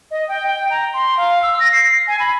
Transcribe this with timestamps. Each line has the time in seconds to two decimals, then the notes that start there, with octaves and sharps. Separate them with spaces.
0.11 D#5
0.28 G5
0.46 G5
0.70 A#5
0.94 C6
1.17 F5
1.42 E6
1.60 A#6
1.73 C7
2.07 G#5
2.20 B5